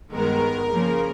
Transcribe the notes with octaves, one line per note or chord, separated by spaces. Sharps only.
G2 D#3 G#3 B3 A#4
C#3 F3 A#3